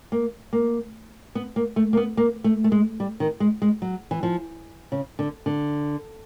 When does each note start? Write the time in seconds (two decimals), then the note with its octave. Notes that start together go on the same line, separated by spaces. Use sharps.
0.12 A#3
0.53 A#3
1.35 B3
1.56 A#3
1.76 A3
1.93 A#3
1.97 B3
2.17 A#3
2.44 A3
2.64 A3
2.72 G#3
3.00 G3
3.20 D#3
3.40 G#3
3.62 G#3
3.82 F#3
4.11 E3
4.23 F3
4.92 C#3
5.19 D3
5.46 D3